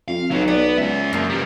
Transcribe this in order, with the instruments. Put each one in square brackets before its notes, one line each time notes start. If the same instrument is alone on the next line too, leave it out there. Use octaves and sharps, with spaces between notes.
[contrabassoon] F2 [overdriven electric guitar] F5
[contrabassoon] B1 [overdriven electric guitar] F#3 B3
[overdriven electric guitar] B3 [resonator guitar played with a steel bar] D5
[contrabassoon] C#2 [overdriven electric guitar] G#4 E5
[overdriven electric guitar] F#2 [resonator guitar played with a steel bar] F3 A#3
[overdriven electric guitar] E3 G3